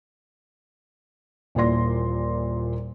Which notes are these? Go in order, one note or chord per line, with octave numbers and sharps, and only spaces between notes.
D#1 A#2 E3 D5 C6 A#6